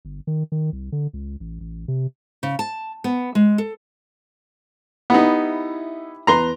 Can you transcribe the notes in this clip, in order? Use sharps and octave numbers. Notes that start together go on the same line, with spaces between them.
G1
D#3
D#3
C2
D3
C#2
A1
A1
C3
C#3
A5
B3
G#3
A4
B3 D#4 E4 G4 B5
E2 B4 A#5 C6 G7